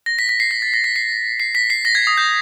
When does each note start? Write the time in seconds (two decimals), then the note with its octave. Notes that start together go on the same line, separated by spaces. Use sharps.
0.06 A#6
0.19 B6
0.29 B6
0.40 C7
0.51 A#6
0.62 A6
0.74 A#6
0.84 B6
0.96 C7
1.40 C7
1.55 B6
1.70 C7
1.85 A#6
1.95 G#6
2.07 D#6
2.18 G6